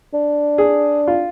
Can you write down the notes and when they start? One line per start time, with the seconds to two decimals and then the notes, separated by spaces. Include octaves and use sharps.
0.14 D4
0.58 G#4
1.07 F4